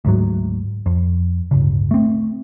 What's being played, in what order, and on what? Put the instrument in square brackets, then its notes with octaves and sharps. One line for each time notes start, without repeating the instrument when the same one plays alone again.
[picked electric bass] D2 G#2 F#3
F2
D1 G1 C#3
A3 C4